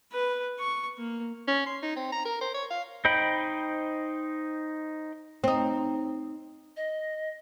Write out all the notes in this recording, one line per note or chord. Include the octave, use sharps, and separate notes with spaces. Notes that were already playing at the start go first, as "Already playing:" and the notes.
B4
C#6
A#3
C#4
C6
D#4
C4
A#5
A#4
C5
C#5
F5
D#4 C5 D#5 G5 B5
C4 D#4
D#5